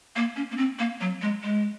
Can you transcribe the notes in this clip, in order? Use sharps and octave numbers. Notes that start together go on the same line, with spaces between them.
A#3
C#4
A#3
C4
A#3
F#3
G#3
G#3